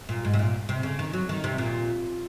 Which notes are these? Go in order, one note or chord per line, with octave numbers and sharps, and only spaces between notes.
A#2
G#2
C3
A#2
C3
C#3
D#3
F#3
D#3
C3
A#2